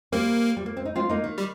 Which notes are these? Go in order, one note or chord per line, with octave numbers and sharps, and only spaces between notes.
G3 A#3 C4
G3
A#3
C4
D#4
C4 F4
A#3 D#4
D#3
G3